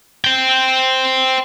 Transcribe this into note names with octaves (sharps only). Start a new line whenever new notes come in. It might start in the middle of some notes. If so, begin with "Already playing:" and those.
C5 G5